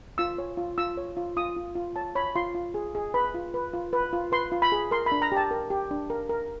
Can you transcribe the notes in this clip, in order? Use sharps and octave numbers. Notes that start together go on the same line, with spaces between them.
F4 E6
C#5
F4
F4 E6
C#5
F4
F4 D#6
F4
F4
C#5 A5
C#5 B5
F4 C6
F4
G#4
G#4
B4 B5
F4
B4
F4
B4
F4
B4 C6
F4
B5
G#4
A#4 C6
B5
D4
A#5
G4 A5
A#4
G4
D4
A#4
A#4